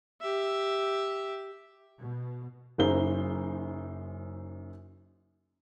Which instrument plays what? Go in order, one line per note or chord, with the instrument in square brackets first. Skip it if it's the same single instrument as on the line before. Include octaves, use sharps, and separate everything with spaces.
[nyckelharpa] G4 E5
[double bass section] B2
[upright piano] F#1 F#2 D#4 C5 G7